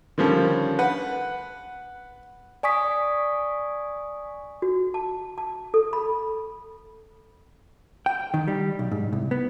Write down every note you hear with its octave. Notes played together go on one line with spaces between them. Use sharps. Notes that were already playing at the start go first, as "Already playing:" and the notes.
D3 D#3 F3 G3 C#4
B4 F#5
D5 G#5 C#6 D#6 B6
F#4
A5
A5
A4
B5
G5
D#3
G3
B1
G#2
C2
B3